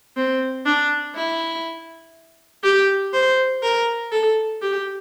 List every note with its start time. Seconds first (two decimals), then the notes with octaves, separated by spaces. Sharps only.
0.16 C4
0.66 D4
1.15 E4
2.64 G4
3.13 C5
3.63 A#4
4.12 A4
4.62 G4